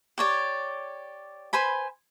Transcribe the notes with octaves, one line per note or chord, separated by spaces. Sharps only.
G4 C#5 D5
B4 C5 G#5 B5